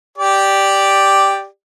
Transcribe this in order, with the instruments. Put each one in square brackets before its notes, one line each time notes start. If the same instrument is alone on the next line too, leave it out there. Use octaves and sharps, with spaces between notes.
[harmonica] G4 D5